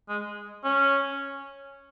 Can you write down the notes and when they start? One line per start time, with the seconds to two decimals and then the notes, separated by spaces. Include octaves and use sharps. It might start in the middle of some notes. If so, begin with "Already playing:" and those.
0.09 G#3
0.64 C#4